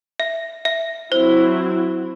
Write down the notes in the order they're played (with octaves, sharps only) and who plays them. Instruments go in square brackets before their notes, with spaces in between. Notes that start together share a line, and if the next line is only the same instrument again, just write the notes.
[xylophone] E5
E5
[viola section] F#3 C4 E4 [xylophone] C5